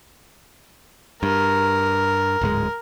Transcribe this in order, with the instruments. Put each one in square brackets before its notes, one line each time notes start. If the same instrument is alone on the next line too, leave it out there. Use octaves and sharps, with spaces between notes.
[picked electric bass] G2 [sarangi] A#4
[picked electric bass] D1 G#2 G#3